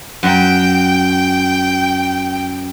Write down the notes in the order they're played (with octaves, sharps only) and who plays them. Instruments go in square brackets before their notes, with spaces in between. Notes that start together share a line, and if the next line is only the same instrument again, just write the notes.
[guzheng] F#2 [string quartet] G5